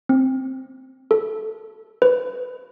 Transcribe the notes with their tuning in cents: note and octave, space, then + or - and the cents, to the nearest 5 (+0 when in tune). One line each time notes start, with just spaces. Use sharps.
C4 +5
A4 -15
B4 +20